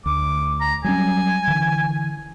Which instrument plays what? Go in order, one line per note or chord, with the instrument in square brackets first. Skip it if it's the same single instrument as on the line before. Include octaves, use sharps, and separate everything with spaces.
[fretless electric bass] D2 [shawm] D6
[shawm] A#5
[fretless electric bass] F#3 G3 C#4 [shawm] G#5
[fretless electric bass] D3 E3